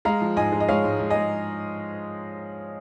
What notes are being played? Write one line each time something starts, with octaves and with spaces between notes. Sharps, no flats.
G#3 F5 A#5
F3
G#2 D#5 G#5
G#3
D#5
G#3 C#5 F5
G#2
G#2
D#5 G#5
G#3